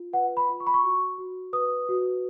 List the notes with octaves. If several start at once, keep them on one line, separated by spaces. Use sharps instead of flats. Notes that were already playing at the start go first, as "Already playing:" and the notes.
Already playing: F4
B4 F#5
B5
F4
C#6
B5
C#6
F#4
F#4
B4 D#6
F#4